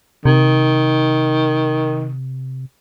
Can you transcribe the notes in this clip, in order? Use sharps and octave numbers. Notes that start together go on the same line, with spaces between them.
C3 D#3